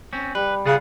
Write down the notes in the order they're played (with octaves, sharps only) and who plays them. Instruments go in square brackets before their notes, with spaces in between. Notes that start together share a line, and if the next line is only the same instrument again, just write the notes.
[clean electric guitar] C4 C#4
[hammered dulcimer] G3 [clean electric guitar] B4
[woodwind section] C#3 [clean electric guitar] F4 G#4 F#5